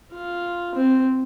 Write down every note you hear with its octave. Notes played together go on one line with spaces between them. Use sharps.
F4
C4